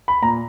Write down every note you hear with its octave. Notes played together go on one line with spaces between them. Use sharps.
B5
A#2 A#5